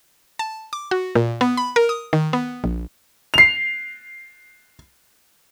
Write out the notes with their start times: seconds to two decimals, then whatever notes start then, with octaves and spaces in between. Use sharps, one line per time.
0.39 A5
0.73 D6
0.91 F#4
1.15 A#2
1.41 B3
1.57 B5
1.76 A#4
1.89 D#6
2.13 D#3
2.33 B3
2.64 A#1
3.34 C7 F7